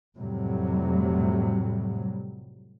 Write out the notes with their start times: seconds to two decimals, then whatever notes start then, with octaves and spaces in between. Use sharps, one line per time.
0.18 F2 A2 C3 F#3 G3